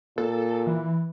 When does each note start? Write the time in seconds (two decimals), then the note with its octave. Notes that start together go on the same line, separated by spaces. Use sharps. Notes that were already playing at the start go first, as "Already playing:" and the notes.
0.18 A#2 A4
0.67 E3